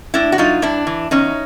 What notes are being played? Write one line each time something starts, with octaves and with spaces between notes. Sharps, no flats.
A2 D4 E4
F#4
F#3 D#4 F4
G2 D4 E4
E3
E2 C#4 D#4